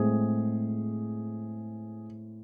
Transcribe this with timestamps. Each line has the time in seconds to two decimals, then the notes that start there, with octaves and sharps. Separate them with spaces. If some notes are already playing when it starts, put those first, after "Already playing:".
Already playing: A2 G#3 C4 G#4